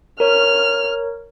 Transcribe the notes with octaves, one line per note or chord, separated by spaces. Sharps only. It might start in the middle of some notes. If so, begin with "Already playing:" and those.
A#4 C#5 F6